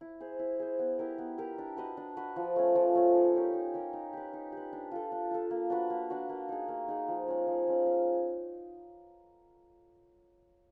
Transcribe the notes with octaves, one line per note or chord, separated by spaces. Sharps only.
E4
G#4 C5
E4
G#4 C5
B3
E4 G4 A#4
B3
E4 G4 A#4
D4
F#4 B4 D#5
D4
F#4 B4 D#5
F3
A3 C#4
F3
A3 C#4
D#4
G4 A#4 C#5
D#4
G4 A#4 C#5
D#4
G4 B4
D#4
G4 B4
D4
F4 A4
D4
F4 A4
A#3
D4 F#4 B4
A#3
D4 F#4 B4
A#3
D#4 G#4
A#3
D#4 G#4
F3
G#3 C#4
F3
G#3 C#4
C#4